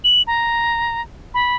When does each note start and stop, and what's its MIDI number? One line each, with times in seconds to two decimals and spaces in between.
0.04 0.22 102
0.27 1.02 82
1.34 1.56 83